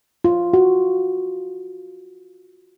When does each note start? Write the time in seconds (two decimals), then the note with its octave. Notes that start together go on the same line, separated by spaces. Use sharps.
0.24 F4
0.53 F#4